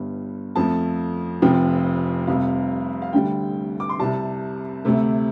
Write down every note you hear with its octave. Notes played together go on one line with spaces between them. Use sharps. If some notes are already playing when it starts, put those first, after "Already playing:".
Already playing: G1 G2 G3
F2 F3 A3 A5
F1 F2 F3 G5
F1 F2 C3 G3 F5
F5
D2 D3 G3 G5
D6
C6
C2 C3 G3 A5
D2 C3 A3